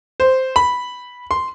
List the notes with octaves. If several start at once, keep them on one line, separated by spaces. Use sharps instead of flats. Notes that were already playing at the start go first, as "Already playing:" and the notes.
C5
B5
C6